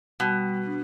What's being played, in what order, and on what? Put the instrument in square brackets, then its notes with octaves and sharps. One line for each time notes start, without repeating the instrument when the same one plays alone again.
[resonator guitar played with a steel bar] B2 [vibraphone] G3
[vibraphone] D4